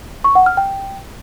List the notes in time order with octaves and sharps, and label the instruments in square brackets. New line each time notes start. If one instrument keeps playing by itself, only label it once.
[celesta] C#6
F#5
F6
G5